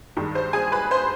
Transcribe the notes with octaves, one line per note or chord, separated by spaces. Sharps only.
G2 D#3 G#3
C5
G#4 G#5
B4 B5
C5 C6